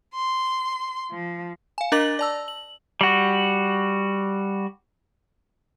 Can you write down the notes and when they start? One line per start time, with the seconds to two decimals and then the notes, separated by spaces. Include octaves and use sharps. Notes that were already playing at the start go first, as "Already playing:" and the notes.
0.15 C6
1.11 F3
1.78 F5 G#5
1.92 D4 A#4 D#5 D6 A6 F#7
2.19 D5 A5 E6
2.48 F#7
3.01 G3 F#4